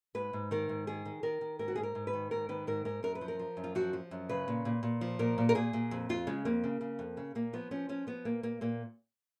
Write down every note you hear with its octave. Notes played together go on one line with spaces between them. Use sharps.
G#2 B4
G#2
D#3 A#4
G#2
D#3 G#4
D#3
D#3 A#4
D#3
G#2 A#4
F#4
G#2 G#4
A#4
G#2
B4
D#3
G#2 A#4
D#3 B4
G#2 A#4
G#2 A#4
F#2 A#4
B4
F3
A#4
F3
F#2
F4
F3 F#4
F3
F#2
C#3 B4
A#2
A#2
A#2
F3
A#2 A#4
A#2
A#4
A#2 G#4
A#2
F2
F2 F4
C#3 G#3
F2 A#3
C#3
C#3
F2
C#3
A#2 A#3
F3 B3
F3 C#4
F3 C#4
F3 B3
A#2 A#3
A#2 A#3
A#2 A#3